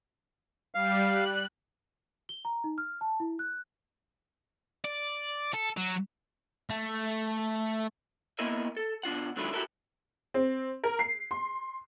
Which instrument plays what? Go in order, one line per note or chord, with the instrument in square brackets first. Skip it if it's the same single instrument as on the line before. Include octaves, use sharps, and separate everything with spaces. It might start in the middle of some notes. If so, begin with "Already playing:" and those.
[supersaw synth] G3 [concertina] F5
[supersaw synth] F#6
[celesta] G7
A#5
D#4
F6
A5
E4
F#6
[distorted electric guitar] D5
A4
F#3
A3
[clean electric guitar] A#3 B3 E4 A#4 D#5 E5
A4
B2 D4 F4 F#5
G#2 D3 D#3 F#3 E4 F4
E4 F#4 G4 A4 A#4 E5
[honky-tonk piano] C4
A#4
C7
C6